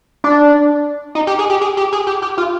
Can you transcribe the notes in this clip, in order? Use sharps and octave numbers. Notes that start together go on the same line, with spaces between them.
D4
D#4
G4
G#4
G4
G#4
G4
G#4
G4
G4
F4